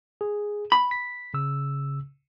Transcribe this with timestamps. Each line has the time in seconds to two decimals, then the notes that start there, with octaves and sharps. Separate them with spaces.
0.21 G#4
0.72 B5
0.91 B6
1.34 C#3 E6